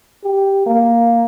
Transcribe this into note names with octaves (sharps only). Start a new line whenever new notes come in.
G4
A#3